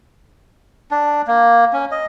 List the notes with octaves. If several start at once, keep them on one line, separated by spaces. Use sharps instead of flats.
D4
A#3
C#4
D#5